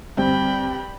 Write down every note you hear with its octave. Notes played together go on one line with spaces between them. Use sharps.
D2 G2 C4 G5 B5